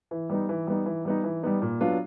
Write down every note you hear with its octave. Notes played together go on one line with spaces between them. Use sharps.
E3
G3 B3 D#4
E3
G3 B3 D#4
E3
G3 B3 D#4
E3
G3 B3 D#4
A#2
F#3 B3 D4 F4